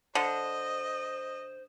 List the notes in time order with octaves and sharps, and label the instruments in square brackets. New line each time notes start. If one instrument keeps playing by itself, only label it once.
[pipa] D3 [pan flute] C5 [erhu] D#5